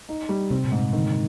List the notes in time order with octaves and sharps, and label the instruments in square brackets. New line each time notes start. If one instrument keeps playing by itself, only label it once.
[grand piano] D#4
G3
[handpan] C3 [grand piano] C4
[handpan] A#2
[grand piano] G#2
[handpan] C3
[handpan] D3 [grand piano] D#3